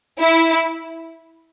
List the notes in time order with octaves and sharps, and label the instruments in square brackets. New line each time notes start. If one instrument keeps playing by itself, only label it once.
[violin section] E4